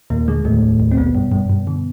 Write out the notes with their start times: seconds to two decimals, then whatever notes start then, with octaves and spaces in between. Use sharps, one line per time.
0.10 D#2 A#2 A#3
0.28 D3 G#3
0.45 D#2 A2 A3
0.63 D#2
0.80 D#2
0.91 C4
0.97 A1 B2 B3
1.15 G2
1.32 G2
1.50 G2
1.67 D3